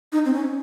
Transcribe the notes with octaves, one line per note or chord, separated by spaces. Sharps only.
D#4
C4
C#4